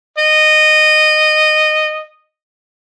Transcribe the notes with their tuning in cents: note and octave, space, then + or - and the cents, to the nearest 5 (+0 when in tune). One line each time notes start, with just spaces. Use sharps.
D#5 -15